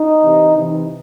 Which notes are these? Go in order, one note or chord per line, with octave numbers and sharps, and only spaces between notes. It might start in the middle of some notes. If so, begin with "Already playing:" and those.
Already playing: D#4
C3 E3
C3 E3